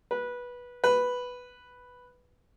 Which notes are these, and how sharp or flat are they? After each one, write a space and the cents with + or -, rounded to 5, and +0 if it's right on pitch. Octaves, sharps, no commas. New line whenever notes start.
B4 -15
B4 +0